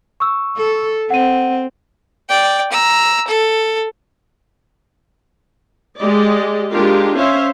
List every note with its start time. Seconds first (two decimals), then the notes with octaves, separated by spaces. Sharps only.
0.20 C#6 E6
0.56 A4
1.10 C4 F#5 D#7
2.29 D5 G5
2.72 A#5 E6
3.28 A4
5.98 G#3 G4 D5 D#5
6.73 G#3 D4 F4 G4 A#4
7.17 C#4 C5 C#5 E5 F5